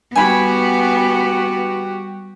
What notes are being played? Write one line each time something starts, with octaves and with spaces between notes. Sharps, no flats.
G3 B3 F#4 G4 G#5 B5 C#6